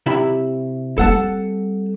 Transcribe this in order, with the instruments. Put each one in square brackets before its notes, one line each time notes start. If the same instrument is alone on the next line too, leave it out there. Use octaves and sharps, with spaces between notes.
[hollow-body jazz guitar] C3 E4 B5
[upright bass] G3 C4 [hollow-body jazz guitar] A4 F#5 A5